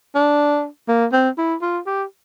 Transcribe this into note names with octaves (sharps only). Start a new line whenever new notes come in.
D4
A#3
C4
E4
F4
G4